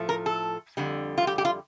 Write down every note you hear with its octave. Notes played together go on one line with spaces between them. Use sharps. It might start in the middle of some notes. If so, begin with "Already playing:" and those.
Already playing: A2 F3 A3
A#4
A4
F2 D3 G3
F4
G4
G4
F4